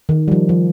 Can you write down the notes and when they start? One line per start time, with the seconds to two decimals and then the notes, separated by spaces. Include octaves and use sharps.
0.09 D#3
0.28 G3
0.32 F3
0.49 F3